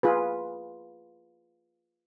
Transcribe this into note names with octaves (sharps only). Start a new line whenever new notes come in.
F4 G#4 B4